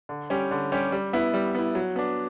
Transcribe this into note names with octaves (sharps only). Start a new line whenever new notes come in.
D3
G3 C#4 G4
D3
G3 C#4 G4
G3
B3 E4
G3
B3 E4
F#3
B3 D4